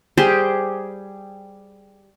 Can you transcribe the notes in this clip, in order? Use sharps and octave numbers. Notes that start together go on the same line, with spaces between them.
G3 G4 G#4 C5